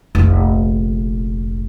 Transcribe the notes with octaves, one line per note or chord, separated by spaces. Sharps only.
F1 A#1